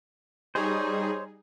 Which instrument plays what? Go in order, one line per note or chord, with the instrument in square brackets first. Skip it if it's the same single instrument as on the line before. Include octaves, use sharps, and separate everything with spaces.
[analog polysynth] G3 D#4 G#4 [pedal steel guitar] C5 C#5